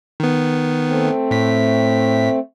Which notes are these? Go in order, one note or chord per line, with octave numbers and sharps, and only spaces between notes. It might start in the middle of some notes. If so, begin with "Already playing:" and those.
D#3 B3
A3 C4
A2 B6